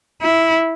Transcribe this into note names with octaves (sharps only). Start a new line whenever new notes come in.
E4